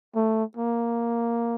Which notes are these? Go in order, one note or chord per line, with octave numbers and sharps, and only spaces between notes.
A3
A#3